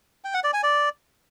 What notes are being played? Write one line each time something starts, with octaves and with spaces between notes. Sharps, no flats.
G5
F#5
D5
G#5
D5